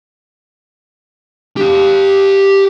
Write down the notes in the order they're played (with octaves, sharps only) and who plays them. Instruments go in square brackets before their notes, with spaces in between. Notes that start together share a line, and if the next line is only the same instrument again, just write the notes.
[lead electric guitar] G4 F5